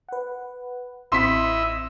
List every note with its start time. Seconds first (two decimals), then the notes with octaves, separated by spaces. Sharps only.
0.09 B4 F#5
1.12 A1 C4 E4 D#5 E5 C6 B6 C#7